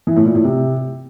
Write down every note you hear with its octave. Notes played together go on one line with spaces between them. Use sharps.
E3
A2
A#2
A2
C3